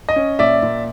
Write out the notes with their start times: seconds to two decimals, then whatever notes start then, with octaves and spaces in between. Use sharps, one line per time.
0.09 D#5
0.16 C#4
0.39 A#2 D5 E5
0.62 A#2